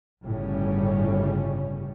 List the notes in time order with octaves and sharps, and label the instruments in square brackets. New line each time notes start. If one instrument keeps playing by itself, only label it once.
[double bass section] G1 A2 C#3 G3 C#4